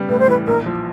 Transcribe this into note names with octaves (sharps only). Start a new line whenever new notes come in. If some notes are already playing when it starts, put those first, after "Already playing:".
Already playing: C#3 G3 B3
A2 B4
C5
E3 B4
A#1 A#4
F3